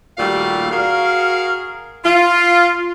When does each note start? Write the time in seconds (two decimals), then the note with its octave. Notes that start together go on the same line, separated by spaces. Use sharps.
0.18 D#2 A#2 G3 A3 F#4 F5
0.72 F#4 G#4 A#4 F5
2.04 F4